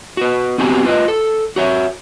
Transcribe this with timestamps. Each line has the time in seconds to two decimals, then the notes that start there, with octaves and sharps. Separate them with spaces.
0.17 F#4 B4
0.58 B3 C4 F#4 G4 G#5
0.84 F4 B4 D#5
1.08 A4
1.56 F#4 C#5 E5